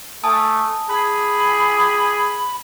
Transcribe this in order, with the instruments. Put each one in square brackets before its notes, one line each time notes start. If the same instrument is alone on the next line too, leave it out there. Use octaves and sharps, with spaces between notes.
[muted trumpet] A3 [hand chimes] G#5 A5 D#6
[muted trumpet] G#4 [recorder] B5